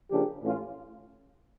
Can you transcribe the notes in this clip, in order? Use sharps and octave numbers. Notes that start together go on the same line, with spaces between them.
C#3 F3 A#3 D4 G4
A2 E3 A3 C#4 F4